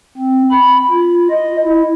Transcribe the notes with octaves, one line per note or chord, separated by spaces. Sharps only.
C4
B5
F4
D#5
E4